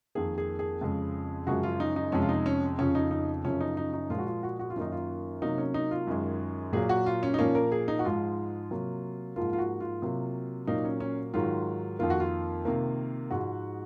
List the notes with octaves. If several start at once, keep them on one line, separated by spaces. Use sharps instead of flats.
F2 D#3 A#3 G#4
G#4
G#4
F2 C#3 G#3
F#2 C#3 F3 G#3 F#4
F4
D#4
D#4
F2 C3 F3 G#3 C#4
F4
D#4
C#4
F2 C#3 F3 C#4
D#4
D#4
F#2 C#3 F3 C#4
D#4
D#4
D#4
A#2 F3 G#3 F4
F#4
F4
F#4
F#4
F4
F#2 D#3 A#3 D#4
F4
C3 F#3 A#3 D#4
C#4
D#4
F4
F#2 D#3 G#3
A#2 F#3 A#3 G#4
F#4
F4
C#4
D#4
A#2 F3 A#3 C#4
A#4
G#4
D#4
F#4
G#2 F3 G#3 F4
C3 F#3 A#3
G#2 F3 A#3 F4
F4
F#4
F4
C3 F#3 A#3
A#2 F#3 A#3 D#4
C#4
C#4
G#2 D#3 F#3 F4
F2 D#3 A#3 F4
F#4
F4
C3 D#3 A#3
G#2 F3 G#3 F#4